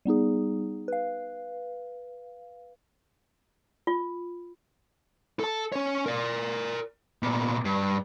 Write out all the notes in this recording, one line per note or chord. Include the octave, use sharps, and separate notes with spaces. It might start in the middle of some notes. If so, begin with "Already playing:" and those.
G3 B3 D#4 G#4
B4 F5
F4
A4 A5
C#4 C#5
A#4 D5
A#2 B3
G2